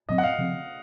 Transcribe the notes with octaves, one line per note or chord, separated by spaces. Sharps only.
A#2 F#3 C4 D#5
F#5
F5
C#3 F3 C4